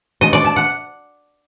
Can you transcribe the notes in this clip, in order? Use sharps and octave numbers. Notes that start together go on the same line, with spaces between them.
D#5
D5
A5
F#5